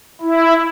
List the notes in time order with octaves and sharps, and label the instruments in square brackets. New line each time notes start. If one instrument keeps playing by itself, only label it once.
[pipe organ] E4